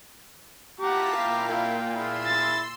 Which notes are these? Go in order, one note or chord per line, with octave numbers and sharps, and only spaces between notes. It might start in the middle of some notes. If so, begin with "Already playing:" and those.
E4 F4 G4 F#5 A5 A#5 D6 B6
A#2 F5 G5
A#3 E4
E4 F4 G#4 C6 E6
A6